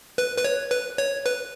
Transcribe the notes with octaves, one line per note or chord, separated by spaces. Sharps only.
B4
B4
C#5
B4
C#5
B4